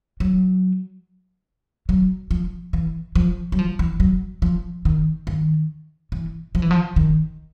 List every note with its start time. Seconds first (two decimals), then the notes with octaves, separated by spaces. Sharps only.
0.20 F#3
1.89 F#3
2.31 F3
2.73 E3
3.15 F3
3.52 F#3
3.59 F3
3.79 E3
4.00 F#3
4.42 F3
4.85 D#3
5.27 D#3
6.12 E3
6.55 F3
6.62 E3
6.71 F3
6.96 D#3